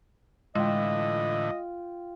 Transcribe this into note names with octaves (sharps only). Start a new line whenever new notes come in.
A2 D3 E3 G#3 F4 D#5 G5